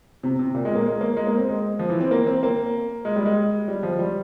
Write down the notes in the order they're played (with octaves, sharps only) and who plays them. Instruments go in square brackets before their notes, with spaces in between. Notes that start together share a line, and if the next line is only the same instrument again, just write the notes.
[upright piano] C3
C3
A#2
G#3
A#3
G#3
A#3
G#3
A#3
C4
G#3
F3
E3
C4
A#3
C4
A#3
G#3
G3
G#3
G3
F3
G3